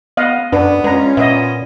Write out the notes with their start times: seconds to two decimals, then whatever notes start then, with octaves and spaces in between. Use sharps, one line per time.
0.17 B3 D#5 F5 F#5
0.52 F#2 B3 D4 B4
0.84 G#3 C#4 F4 B4 A#5
1.17 A#2 B3 D#5 E5